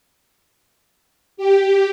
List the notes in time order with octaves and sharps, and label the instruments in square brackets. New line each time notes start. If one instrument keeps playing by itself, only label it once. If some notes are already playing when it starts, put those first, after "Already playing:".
[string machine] G4